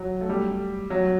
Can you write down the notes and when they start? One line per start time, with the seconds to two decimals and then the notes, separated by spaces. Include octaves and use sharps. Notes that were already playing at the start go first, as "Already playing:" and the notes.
Already playing: F#3
0.21 A3
0.29 G3
0.90 F#3